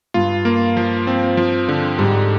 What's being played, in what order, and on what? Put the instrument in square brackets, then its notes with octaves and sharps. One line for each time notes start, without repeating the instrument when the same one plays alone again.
[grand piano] G2 [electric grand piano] F4
[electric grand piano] A#3
F3
C4
F3
D3
[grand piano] G#2 [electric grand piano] G3